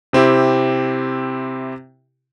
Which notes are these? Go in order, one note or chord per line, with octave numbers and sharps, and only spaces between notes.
C3 C4 E4 G4